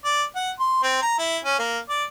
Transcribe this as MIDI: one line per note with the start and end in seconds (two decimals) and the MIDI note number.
0.04 0.23 74
0.35 0.51 78
0.59 0.80 84
0.83 0.98 60
1.02 1.15 82
1.19 1.38 64
1.45 1.57 61
1.59 1.78 58
1.89 2.04 74